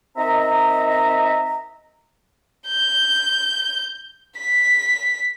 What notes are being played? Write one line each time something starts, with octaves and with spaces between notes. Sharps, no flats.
C4 D#4 A#4 D#5 E5 A#5
G6
B6